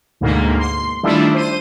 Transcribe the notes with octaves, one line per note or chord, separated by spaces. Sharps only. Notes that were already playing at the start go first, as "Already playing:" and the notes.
D2 G#2 B2 A#3
C6
D#3 G3 A3 D4 E4 F4
C5 D#7